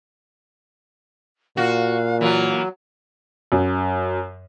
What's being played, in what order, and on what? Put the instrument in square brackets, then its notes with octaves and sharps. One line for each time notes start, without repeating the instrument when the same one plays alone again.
[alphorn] A#2 [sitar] F#4 [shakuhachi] F5
[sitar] E3 F4 [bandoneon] F#3 [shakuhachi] A#3
[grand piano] F#2